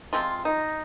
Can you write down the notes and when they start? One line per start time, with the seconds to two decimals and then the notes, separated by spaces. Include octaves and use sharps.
0.13 C3 F3 G#3 C4 F4
0.45 D#4